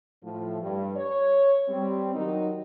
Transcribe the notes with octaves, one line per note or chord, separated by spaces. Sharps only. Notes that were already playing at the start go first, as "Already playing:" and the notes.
A2 F3
G2
C#5
G3 C4
D#3 F#3 D#4